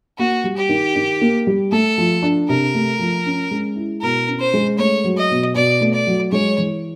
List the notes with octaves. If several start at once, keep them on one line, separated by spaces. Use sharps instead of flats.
A#3 F#4
G3
G4
D#3
D#3
A#3
G3
A3 A4
F3
D4
C3 A#4
A3
F3
C#4
G#3
E4
B2 A#4
C#4
C5
G#3
A3 C#5
F#3
D#5
B2
B2 D5
A3
D5
F#3
G#3 C#5
E3